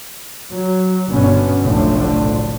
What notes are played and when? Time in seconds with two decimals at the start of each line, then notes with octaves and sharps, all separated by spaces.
0.53 F#3
1.10 G1 B2 D3 B3 C#4
1.63 F1 B1 A2 D3 F3